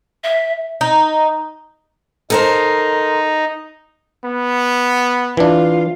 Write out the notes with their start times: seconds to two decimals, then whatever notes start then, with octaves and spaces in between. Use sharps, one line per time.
0.23 E5
0.81 D#4
2.30 D#4 A4 A#4 C5
4.25 B3
5.37 E3 D4 F4